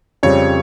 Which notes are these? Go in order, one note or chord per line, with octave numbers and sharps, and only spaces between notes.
F2 C#3 G3 C#5